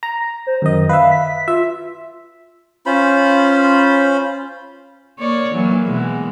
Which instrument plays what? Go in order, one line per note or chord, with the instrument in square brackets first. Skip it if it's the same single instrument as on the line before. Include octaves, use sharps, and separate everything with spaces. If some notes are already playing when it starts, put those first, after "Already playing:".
[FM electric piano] A#5
[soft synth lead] C5
[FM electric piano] F#2 D#5 [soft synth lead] D#3
[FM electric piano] B4 E5 [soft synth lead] F5
[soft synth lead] B6
[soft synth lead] F4 [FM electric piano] E5
[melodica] C#4 F4 C5 B5
[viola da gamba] A#3 C#5 D5
E3 F#3 A#3
B2 E3 G#3